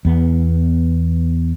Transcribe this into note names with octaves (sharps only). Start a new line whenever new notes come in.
E2 B3